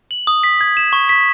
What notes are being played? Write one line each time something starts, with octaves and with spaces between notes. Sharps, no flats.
F#7
D#6
B6
G#6
E7
C#6
B6